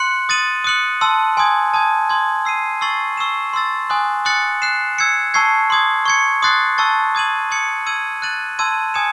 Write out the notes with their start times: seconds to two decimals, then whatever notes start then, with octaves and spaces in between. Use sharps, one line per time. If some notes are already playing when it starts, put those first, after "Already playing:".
Already playing: C6 F#6 C#7 F#7
0.29 D#6 A6 D#7 F#7
0.64 D#6 F#6 C#7 F#7
1.01 A5 C6 E6
1.37 G#5 C6 D#6 G#6
1.74 A5 D#6 G#6
2.10 C6 D#6 G#6
2.45 E6 C7 D#7
2.81 C#6 E6 A6 C7 F#7
3.17 C#6 E6 C7 E7
3.53 C6 E6 A6
3.90 G#5 C6 D#6 F#6
4.25 D#6 F#6 A6 C#7 F#7
4.62 F#6 C7 E7
4.98 E6 G#6 C#7
5.34 A5 C#6 E6 G#6 C7
5.70 C6 D#6 G#6
6.06 C#6 G#6 C#7
6.42 C6 D#6 F#6 A6 C7
6.78 A5 C#6 E6 A6
7.15 D#6 G#6 D#7 F#7
7.51 D#6 G#6 C#7 F#7
7.86 E6 G#6 D#7 F#7
8.22 F#6 A6 D#7 F#7
8.59 A5 C6 E6 G#6 D#7
8.94 G#5 D#6 G#6 C#7 E7